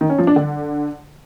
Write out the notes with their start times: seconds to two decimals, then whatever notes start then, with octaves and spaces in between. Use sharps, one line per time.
0.01 D#3
0.10 C#4
0.18 F3
0.27 D4
0.36 D3